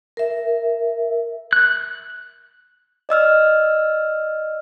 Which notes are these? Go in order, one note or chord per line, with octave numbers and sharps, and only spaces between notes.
A#4 E5
F#6
D5 D#5 E6 F6